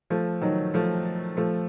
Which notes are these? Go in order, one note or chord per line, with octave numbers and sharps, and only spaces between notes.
F3 A3
D#3 F#3
F3 A3
F3 A3